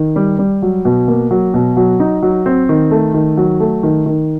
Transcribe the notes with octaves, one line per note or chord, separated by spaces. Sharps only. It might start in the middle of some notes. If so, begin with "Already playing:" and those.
Already playing: D#3
G3
G3
F#3
B2
A#3
F#3
B2
F#3
D#4
F#3
C4
D#3
A3
D#3
F#3
A3
D#3
D#3